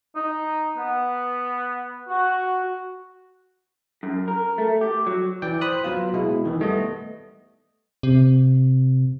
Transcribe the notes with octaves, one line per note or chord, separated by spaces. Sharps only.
D#4
B3
F#4
F#2
A#4
A3
G4
F#3
E3 D5 G5
C5 B5 D#6 F#6
F#3 B3 F4
B2 G#3 E4
D#3 E3
G3 A3 B3 D#5
C3